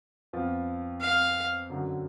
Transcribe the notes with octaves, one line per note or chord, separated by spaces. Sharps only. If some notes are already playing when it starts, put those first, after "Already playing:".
F2 F3 B3 F4
F5
F#2 D3 F#3